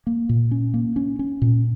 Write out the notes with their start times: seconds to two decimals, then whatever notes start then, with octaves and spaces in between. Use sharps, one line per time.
0.07 A#3
0.29 A#2
0.51 C#4
0.74 A#3
0.96 C#4
1.19 C#4
1.42 A#2